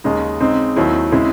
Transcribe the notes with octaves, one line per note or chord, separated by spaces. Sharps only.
D#2 C#3 G#3 D#4
C#3 G#3 C4 D#4
D#2 D#3 F#3 C4 E4
C#3 G#3 C4 E4